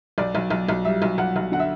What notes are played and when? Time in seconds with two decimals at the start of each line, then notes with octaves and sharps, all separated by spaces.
0.18 B1 D5
0.35 B1
0.50 B1
0.69 B1
0.84 G3 E5
1.02 B1
1.18 B1 F#5
1.36 B1
1.52 D3 F#5
1.59 E5